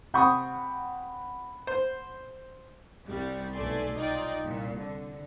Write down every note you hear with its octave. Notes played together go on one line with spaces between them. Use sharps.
C3 F#5 B5 C#6 D#6 G6
C5
C2 G3
B1 A3 A4 D5 G#5 C6
D#4 F4 D5 G5
C2 A#2
D3